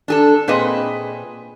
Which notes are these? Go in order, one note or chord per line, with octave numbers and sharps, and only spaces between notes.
D4 G#4 A4
A#2 C4 G#4 B4 D#5